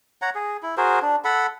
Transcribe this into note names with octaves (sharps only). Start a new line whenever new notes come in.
C#5 F#5 A#5
G#4
E4
F#4 G#4 A#4 C5
D4
A4 F#5 B5